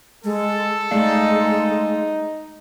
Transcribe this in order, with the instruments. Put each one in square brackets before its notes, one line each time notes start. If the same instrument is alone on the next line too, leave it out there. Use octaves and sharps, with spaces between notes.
[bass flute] G#3 [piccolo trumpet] A4
[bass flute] G#3 [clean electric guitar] A3 D5 F5 [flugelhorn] D#4